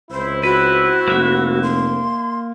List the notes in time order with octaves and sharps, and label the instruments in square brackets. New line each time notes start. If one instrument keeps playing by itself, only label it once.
[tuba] C#2 [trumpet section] C4 E4 [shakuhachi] C5
[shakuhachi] F#4 [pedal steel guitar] B4
[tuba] F1 [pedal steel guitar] A#3 E5
[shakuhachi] C6